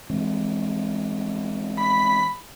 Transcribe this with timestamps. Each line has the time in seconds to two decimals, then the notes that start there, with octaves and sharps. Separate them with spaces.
0.10 E3 G#3 C4
1.77 B5